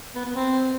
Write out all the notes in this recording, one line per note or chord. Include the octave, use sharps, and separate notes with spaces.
B3
B3
C4